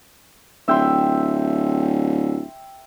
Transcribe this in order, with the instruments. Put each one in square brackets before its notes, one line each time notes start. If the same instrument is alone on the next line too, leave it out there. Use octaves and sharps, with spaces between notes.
[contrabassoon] D1 [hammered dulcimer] E5 G5 C6